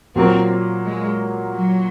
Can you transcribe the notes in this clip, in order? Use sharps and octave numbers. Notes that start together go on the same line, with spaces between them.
A#2 F#3 A#3 C4
G#3
F#3